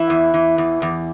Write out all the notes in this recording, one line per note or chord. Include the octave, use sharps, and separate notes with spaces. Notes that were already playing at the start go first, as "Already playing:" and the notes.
Already playing: E3 E4
E2
E3
E2
E2